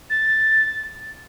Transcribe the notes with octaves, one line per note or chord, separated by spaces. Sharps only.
A6